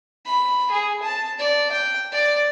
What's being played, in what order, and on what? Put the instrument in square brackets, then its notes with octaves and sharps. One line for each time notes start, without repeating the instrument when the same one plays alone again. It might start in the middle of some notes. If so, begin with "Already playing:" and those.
[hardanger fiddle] B5
G#4
A5
D5
G5
D5